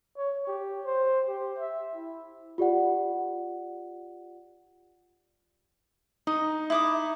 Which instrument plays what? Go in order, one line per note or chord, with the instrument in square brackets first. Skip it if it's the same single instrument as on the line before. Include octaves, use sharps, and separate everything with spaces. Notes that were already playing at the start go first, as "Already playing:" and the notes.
[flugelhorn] C#5
G4
C5
G4
E5
E4
[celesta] F4 G4 D5 F#5
[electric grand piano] D#4 [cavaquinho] D#5
[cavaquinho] E4 D6 D#6